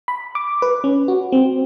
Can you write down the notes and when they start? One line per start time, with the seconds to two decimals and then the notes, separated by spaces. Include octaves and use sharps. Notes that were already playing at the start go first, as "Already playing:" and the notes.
0.08 B5
0.35 D6
0.62 B4
0.84 C#4
1.08 F#4
1.32 C4